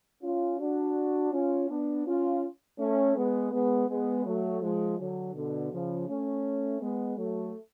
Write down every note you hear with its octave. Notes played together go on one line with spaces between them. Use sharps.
C#4 F4
D4 F#4
C#4 F4
B3 D4
C#4 F4
A3 C#4
G#3 B3
G#3 B3
G#3 B3
F#3 A3
F3 G#3
D3 F#3
B2 D3
C#3 F3
A3 C#4
G#3 B3
F#3 A3